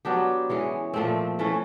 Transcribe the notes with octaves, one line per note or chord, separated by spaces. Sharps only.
F#3 B3 D4 G4
E3 G#3 C#4
A#2 F3 A3 C4
E3 A3 C#4